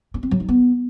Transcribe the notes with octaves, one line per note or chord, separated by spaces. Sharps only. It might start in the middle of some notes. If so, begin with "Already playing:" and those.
C#4
C4
F#3
D#4
B3